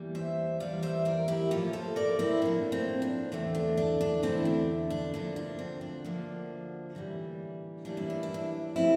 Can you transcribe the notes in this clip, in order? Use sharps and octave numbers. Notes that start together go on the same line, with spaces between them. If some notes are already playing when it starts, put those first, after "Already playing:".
Already playing: E2 E3 G3 A#3
C5 E5
E2 E3 G3 A#3 D5 F5
C5 E5
A#4 D5
E4 G4
A2 F3 A#3 F4 A4
A4 C5
A#4 D5
C4 E4
A2 F3 A#3 D4
C4
D4
E2 D3 A3 C4
D4
D4
D4
E2 D3 A3 C4 E4
D4
D4
D2 D3 F3 A#3 D4
D4
C4
D4
D2 D3 F3 A#3
A2 E3 G3 A#3
A2 E3 G3 A#3 D4
E4
D4
E4
D4
C3 F3 A3 C4 E4